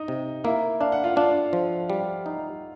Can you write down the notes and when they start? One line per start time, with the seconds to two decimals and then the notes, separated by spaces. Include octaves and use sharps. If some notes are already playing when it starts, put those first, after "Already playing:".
Already playing: D#4 D#5
0.08 C3
0.44 A#3 E4 E5
0.81 D4 F5
0.92 F#5
1.04 F4 F5
1.16 D4 F4 F5
1.53 F3
1.90 G3
2.26 D#4